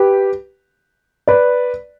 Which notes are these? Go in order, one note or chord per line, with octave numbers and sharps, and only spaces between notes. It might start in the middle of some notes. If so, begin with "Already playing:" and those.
Already playing: G4 B4
B4 D5